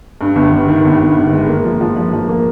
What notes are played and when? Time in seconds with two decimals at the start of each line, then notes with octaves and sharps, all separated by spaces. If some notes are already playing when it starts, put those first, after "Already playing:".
0.21 G2
0.36 G1
0.53 G1
0.68 D#3
0.85 G1
1.00 G1
1.16 G1
1.33 G#3
1.48 A#3
1.64 F3
1.81 F3
1.96 F3
2.13 F3
2.29 A#3